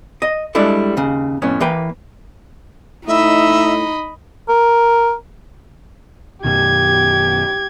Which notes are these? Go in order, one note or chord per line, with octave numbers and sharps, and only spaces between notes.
D#5
G3 G#3 D4 E4 A4 E5
D#2 C#3
F2 A2 B3 C#4
E3 A#3 B4 G5
A2 D#4 D#5 E5 B5
A#4
F#2 B2 D#3 G4 G#6